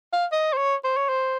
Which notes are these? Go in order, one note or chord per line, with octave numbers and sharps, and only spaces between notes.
F5
D#5
C5
C#5
C5
C#5
C5